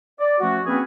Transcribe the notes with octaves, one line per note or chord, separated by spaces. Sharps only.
D5
F3 A3 C#4 F#4
A#3 C4 C#4 F#4 G#4 B4